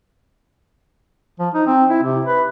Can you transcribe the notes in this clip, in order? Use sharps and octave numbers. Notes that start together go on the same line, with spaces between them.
F3
D#4
C4
E4
C3
B4